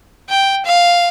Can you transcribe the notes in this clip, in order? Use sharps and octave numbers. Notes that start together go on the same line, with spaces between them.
G5
F5